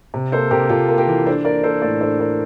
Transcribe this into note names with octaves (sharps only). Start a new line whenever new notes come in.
C3
A#3 A4 C5
C3 G4 A#4
C3 F4 A4
A#3
G4 A#4
E3
D4 A4 C5
A#3 A#4 D5
A#3 A4 C5
A2 A#4 D5
D4 A4 C5
D4 A#4 D5